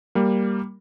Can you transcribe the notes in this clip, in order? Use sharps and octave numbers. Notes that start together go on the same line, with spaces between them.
G3 A#3